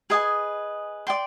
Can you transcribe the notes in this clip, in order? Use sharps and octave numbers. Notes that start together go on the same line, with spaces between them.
G#4 B4 D#5 G#5
D5 G5 C6